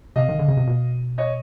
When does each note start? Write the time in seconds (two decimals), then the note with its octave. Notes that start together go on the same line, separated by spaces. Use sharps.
0.16 C3 D#5 F5
0.29 D#3
0.39 D3
0.48 C#3
0.57 C3
0.67 B2
1.18 C#5 D#5